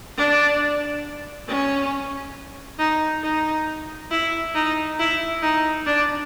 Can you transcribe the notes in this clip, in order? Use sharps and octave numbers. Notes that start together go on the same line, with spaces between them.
D4
C#4
D#4
D#4
E4
D#4
E4
D#4
D4